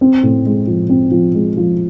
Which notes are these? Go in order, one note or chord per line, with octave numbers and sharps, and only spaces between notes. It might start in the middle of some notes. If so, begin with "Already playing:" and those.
C4
A2
G#3
F3
C4
F3
G#3
F3